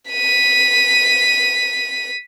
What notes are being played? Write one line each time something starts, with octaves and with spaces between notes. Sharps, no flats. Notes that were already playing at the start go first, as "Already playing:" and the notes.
B6 D#7